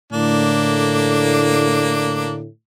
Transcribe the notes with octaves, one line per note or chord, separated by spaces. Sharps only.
A2 D3 A#3 D4